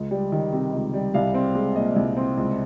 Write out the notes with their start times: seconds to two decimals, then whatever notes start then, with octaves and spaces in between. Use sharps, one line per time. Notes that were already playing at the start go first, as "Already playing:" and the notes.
Already playing: C#2
0.11 G3
0.32 D#3
0.52 C3
0.73 C#2
0.93 G3
1.14 C2 F5
1.34 C4
1.55 G#3
1.76 A#2 D#5
1.96 C2
2.17 C4
2.37 C#2